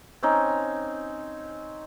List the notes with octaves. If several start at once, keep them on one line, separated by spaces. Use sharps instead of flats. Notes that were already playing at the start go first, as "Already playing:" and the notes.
C4 C#4 D#4